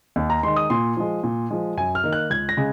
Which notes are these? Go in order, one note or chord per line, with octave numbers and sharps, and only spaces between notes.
D#2
A#5
D#3 G#3 C6
D#6
A#2 C6
F3 G#3
A#2
F3 G#3
F#2 G#5
F6
D#3 A#3
F#6
C#2 G#6
A#6
C#3 G#3